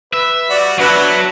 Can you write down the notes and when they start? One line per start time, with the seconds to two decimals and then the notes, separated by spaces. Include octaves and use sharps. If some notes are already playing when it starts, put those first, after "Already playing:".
0.13 B4 E5
0.50 G3 F#4 D5
0.79 F#3 B3 D4 E4 B4